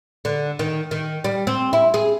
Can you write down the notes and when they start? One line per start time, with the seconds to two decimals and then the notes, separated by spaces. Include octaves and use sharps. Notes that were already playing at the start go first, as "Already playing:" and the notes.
0.25 D3
0.59 D#3
0.91 D#3
1.24 G3
1.47 C4
1.73 E4
1.94 G#4